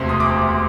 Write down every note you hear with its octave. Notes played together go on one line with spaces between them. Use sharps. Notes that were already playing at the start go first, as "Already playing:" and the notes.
Already playing: E1 D2 C3 C6
D#6
D6